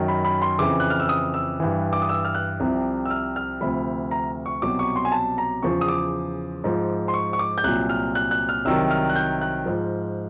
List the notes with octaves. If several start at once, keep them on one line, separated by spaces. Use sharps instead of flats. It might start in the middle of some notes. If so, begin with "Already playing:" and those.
Already playing: F#2 D#3 F#3
B5
B5
C6
F2 C#3 E3 D6
F#6
F6
E6
D#6
E6
G2 E3
D6
D#6
E6
F6
F#6
C2 C3 F3
E6
F6
F6
D2 C3 F3 B5
A#5
C#6
C2 B2 F#3 D6
C#6
C6
G#5
A5
A#5
E2 C#3 F3 C#6
D#6
D6
G#2 F3
C6
C#6
C#6
D6
G6
C2 A#2 F#3 F#6
F6
F#6
F#6
F6
C2 C3 D#3 F#3 E6
F6
F#6
G6
F#6
G#2 F3